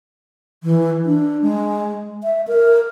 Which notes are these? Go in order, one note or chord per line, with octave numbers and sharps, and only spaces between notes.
E3
D4
G#3
E5
A#4